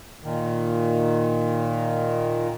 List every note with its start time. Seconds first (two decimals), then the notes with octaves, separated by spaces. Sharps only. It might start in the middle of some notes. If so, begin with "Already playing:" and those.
0.24 A#2 D#3